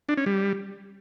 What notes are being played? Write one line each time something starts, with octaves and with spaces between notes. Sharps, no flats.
D4
C#4
G3